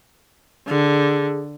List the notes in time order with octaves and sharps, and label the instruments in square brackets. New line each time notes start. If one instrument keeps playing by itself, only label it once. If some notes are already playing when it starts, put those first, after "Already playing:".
[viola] D3 [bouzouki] G#4 A4 F5